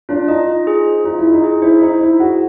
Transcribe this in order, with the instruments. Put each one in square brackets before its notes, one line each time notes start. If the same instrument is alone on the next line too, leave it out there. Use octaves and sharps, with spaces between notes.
[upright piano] D4 [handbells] F4
[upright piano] D#4 [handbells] D#5
[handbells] F4
G#4
C5
[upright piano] D#4 [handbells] F4
[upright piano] E4
[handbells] G#4
[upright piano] D#4
[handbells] G#4
[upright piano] E4 [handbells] C5
[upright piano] D#4 [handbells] C5
[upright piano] E4 [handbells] C5
[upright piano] F#4 [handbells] G#4